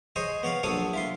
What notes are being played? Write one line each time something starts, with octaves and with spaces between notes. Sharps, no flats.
G#4 C5 C#5 D#5 G#5
B3 C#5 D5 F5
A#1 F#3 D4 A4 C#5 D#6
E4 F4 C6